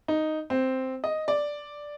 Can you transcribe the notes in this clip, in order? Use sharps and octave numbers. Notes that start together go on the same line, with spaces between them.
D#4
C4
D#5
D5